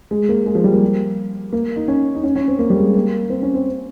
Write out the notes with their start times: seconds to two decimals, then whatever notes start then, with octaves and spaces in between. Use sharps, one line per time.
0.11 G#3
0.29 A#3
0.46 G#3
0.55 F3
0.64 G3
0.73 A#3
1.53 A#3
1.76 D#4
1.88 C#4
2.15 D#4
2.23 C#4
2.36 C#4
2.48 C4
2.59 A#3
2.70 G3
2.77 G#3
2.94 A#3
3.30 C4
3.42 C#4
3.54 C4